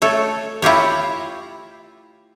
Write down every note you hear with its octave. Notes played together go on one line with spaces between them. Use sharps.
A3 A4 C#5
E4 F4 G4 C#5